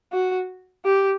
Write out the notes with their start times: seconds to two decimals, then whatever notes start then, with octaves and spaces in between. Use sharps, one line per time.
0.13 F#4
0.85 G4